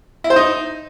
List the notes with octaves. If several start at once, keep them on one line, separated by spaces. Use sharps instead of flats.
E4
C5
D#4